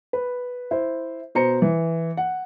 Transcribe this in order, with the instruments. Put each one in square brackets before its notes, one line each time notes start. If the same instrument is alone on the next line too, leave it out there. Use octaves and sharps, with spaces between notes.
[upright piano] B4
E4 C5
B2 C5 A#5 C#7
E3
F#5